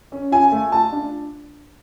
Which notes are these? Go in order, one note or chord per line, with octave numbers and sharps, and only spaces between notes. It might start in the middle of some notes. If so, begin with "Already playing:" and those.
C#4
F4 G#5
A3
F4 A5
D4